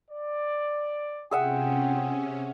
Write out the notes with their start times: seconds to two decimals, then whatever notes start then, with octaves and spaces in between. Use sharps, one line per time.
0.11 D5
1.31 C3 C#4 F4 G#4 E5 F#5 G5